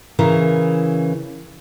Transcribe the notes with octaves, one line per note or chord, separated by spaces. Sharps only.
C#3 E3 A#4